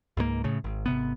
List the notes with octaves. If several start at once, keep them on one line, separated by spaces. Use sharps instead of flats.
C#2 G#2 G#3 A#3
A2 C#3 A3
G#1
G#1 C3 B3